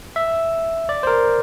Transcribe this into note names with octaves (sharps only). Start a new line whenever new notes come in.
E5
D5
C5
A#4